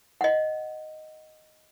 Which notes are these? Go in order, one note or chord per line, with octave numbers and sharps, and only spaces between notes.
D#5 F#5